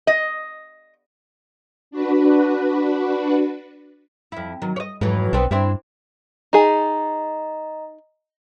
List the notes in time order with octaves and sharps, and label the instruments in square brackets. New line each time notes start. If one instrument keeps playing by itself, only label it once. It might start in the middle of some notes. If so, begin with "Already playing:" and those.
[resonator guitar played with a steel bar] D#5
[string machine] D4 F#4 B4
[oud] F2 E4
D#3 F#3
C#5 D#5
[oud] F2 E3 F#3 [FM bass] G#2
[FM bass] B1 [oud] B3 C4 D4
[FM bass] G2 [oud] C4 D4 E4
[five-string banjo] D#4 G#4 [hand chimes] D#5 A#5